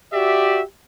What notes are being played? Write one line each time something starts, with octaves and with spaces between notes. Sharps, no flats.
F#4 G4 D5 E5